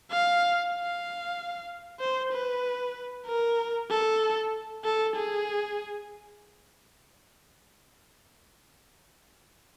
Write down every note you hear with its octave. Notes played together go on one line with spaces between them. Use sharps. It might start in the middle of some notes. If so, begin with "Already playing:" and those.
F5
F5
C5
B4
A#4
A4
A4
G#4